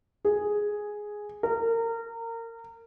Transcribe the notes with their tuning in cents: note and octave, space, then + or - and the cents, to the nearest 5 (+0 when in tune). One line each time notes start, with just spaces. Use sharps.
G#4 +0
A#4 -25